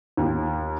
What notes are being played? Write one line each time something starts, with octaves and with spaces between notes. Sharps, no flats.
D#2